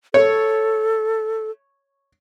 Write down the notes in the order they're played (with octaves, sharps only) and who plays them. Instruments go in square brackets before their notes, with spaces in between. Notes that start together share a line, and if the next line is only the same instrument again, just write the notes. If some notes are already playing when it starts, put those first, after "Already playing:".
[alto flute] A4 [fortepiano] C#5